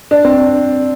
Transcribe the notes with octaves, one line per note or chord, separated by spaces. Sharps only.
D4
C4
D4